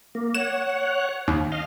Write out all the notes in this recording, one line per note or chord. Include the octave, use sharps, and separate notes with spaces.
A#3
C#5 F#5 E7
D#2
D#5 F5